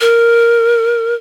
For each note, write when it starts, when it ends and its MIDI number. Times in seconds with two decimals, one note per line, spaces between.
0.01 1.14 70